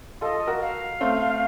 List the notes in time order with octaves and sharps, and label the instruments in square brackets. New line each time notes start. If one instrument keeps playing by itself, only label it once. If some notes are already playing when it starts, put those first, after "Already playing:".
[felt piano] F4 A4 [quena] D#5
[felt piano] F#4 A#4
[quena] F5
[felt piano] A3 C4